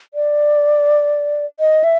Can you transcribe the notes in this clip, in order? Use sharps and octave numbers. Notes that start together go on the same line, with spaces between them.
D5
D#5
E5